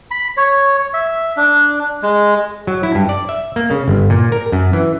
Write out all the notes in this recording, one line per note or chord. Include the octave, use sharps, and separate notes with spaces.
B5
C#5
E5
D4
G#3
F#3
E4
G2
D5
E5
A#3
C#3
G1
A#2
A#4
F#2
E3